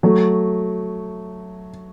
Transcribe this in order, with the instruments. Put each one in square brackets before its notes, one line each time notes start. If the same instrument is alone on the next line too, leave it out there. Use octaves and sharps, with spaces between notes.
[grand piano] F#3 A3